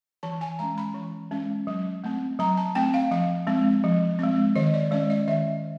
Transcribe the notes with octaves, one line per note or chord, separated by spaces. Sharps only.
E3 A5
G#5
G#3 C#4 A#5
B5
E3
G#3 C#4
F#3
A3 C4
F#3 A#5
A5
A3 C4 G5
F5
F3 F5
G#3 C4
F3
G#3 C4
D#3 D#5
D5
G#3 C#4 D5
D#5
D#3 E5